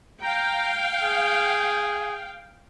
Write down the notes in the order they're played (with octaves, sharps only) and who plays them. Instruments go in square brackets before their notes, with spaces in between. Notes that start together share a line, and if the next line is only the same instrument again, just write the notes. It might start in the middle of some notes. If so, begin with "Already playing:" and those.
[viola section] F5 G5 [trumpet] A#5
[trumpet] G#4